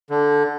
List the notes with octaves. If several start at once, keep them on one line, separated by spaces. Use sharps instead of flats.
D3